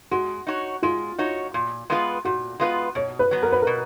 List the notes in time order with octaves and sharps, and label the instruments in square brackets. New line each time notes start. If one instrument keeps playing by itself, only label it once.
[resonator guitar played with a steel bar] G#3 [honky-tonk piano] F#4
[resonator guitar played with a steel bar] D#4 F#4 C#5
[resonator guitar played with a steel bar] G#3 [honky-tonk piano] F4
[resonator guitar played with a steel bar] D#4 F#4 C#5
A#2
G#3 B3 F4 B4
[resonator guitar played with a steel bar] A#2 [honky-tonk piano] F#4
[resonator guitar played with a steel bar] G#3 B3 F4 B4
[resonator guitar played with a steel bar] B2 [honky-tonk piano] C#5
[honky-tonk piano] B4
[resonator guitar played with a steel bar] F#3 B3
[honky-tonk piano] A#4
B4
[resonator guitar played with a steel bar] B2 [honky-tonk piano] A#4